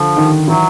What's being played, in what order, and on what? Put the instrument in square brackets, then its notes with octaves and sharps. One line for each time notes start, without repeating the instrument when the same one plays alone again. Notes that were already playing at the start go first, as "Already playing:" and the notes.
Already playing: [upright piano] D3 D4 [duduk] F3
[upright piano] D#3 D#4
[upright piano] E3 E4 [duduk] F#3